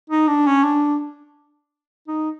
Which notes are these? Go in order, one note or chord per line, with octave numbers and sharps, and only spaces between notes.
D#4
D4
C#4
D4
D#4